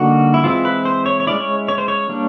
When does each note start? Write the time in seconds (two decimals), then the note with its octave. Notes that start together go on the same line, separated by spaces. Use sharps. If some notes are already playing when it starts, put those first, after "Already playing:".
Already playing: D3 G3 A#3 D#4 F#4
0.34 E4
0.44 E3 G#3 C4 E4 F4
0.65 B4
0.85 C5
1.06 C#5
1.20 C#5
1.27 G#3 C#4 E4 D5
1.40 C#5
1.68 C#5
1.78 C5
1.88 C#5
2.09 G3 A#3 D4